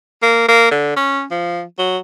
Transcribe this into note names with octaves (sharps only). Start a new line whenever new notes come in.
A#3
A#3
D3
C#4
F3
F#3